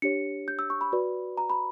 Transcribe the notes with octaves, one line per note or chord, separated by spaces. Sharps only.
D4 G4 C#5 C#7
G6
E6
C#6
B5
F#4 B4 D5
A#5
B5